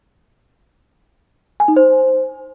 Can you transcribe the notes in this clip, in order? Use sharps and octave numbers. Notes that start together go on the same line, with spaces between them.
G#5
D#4
C5